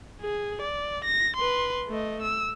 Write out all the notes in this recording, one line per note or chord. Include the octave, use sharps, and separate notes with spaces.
G#4
D5
A#6
B4 C6
A3 D#5
E6